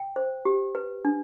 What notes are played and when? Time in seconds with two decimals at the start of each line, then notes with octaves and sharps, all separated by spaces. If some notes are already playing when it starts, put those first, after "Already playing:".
Already playing: G5
0.16 C5
0.45 G4
0.75 B4
1.05 D4